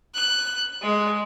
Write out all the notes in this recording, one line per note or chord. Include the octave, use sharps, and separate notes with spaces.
F#6
G#3